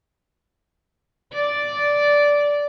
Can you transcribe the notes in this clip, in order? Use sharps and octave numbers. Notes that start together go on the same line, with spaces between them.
D5